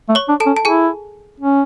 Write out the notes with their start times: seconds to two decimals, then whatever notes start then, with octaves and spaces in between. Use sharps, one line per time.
0.09 A3
0.15 C#5 C#6
0.29 D4
0.40 A4 A5
0.46 C#4
0.57 A5
0.65 E4 G#4 G#5
1.40 C#4